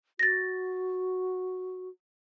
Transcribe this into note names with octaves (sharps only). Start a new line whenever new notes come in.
F#4 A6 A#6